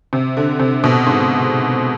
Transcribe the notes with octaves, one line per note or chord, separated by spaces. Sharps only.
C3
D3
C3
B2
G#2